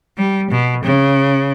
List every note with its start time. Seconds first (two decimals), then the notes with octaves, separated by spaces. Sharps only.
0.18 G3
0.51 B2
0.83 C#3